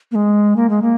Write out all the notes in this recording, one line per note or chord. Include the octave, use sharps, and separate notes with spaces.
A#3
G#3
A#3
G#3
A#3